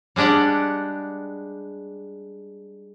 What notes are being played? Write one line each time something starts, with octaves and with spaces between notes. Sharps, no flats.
G3 G#3 D4 G4 F#5